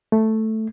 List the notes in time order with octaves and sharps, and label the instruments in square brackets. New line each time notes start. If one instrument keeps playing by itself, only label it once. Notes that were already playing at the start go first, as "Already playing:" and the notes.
[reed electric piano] A3